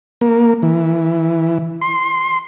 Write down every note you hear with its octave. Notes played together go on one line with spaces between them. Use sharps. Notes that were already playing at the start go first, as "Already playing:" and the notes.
A#3
E3
C6